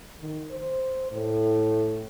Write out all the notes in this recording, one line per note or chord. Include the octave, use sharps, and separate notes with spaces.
D#3
C5
A2